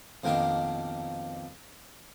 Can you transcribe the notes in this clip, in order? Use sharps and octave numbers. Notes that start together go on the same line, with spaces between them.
F2 B2 D#3 A#3 D4